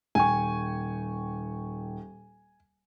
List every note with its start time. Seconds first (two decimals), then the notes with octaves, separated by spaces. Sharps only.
0.15 D#1 G5 G#5 C#6